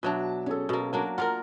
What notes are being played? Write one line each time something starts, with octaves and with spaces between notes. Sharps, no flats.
B2 F#3 D4 E5 A5
C#4 G#4 A4
B2 A#3
F#3 A#3 D4
F4 A#4 F#5 A#5 F6